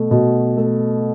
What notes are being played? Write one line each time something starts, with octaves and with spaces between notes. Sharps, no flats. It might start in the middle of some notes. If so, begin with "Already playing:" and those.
Already playing: B2 A3
B2
A3